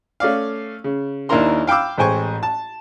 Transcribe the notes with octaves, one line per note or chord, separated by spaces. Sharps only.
A3 C#4 D5 F5
C#3
D#2 D4 E4 A#4 A#5 C6
F5 G5 B5 D6 E6
A1 G#3 C5 G5 G#5 C#6
A5